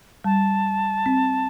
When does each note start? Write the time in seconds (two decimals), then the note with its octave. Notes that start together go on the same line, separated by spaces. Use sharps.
0.24 G3 A5
1.06 C4